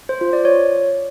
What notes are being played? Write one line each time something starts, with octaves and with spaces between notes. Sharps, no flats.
C5
F4
D5
C#5